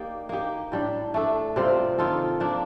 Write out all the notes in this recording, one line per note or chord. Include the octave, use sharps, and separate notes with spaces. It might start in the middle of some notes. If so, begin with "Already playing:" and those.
Already playing: A#3 D#4 G4 D5
A#3 D#4 G4
A2 G3 D4
A3 D4 A4
C3 G3 C4 F4
D#3 A#3 F4 A4
F3 A#3 D4